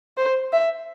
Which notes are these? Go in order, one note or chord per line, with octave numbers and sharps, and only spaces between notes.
C5
E5